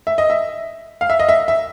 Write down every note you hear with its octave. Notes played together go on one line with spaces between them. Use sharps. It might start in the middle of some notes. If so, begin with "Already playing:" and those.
E5
D#5
E5
F5
E5
D#5
E5
E5